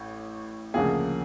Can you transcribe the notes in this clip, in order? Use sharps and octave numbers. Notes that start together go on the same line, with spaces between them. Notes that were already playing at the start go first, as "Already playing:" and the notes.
Already playing: A1 A2
D2 C#3 F3 A#3 G#4